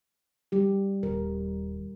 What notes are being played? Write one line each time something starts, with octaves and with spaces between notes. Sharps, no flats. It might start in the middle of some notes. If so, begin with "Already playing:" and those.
G3 G4
D#1 A#4